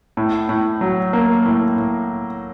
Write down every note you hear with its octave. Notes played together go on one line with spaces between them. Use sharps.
A2
A2
F#3
A#3
A2
A2